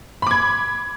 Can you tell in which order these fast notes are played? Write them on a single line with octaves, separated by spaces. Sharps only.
B5 D6 G#6